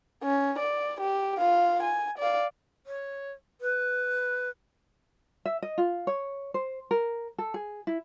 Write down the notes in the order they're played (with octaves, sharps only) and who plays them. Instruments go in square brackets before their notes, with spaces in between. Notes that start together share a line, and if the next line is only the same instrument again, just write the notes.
[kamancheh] C#4
D5
G4
F4 F5
G#5
D5 F5
[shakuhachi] C#5
B4
[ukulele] E5
D#5
F4
C#5
C5
A#4
A4
G#4
E4